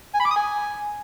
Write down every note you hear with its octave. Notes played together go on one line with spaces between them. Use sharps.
G#5
B5
D6
D#6
G#5